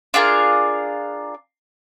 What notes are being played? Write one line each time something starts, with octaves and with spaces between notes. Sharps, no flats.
D4 F4 G#4 A#4